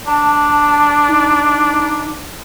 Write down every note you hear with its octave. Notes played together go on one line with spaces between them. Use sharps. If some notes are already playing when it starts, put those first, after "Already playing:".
D4 A5
D#4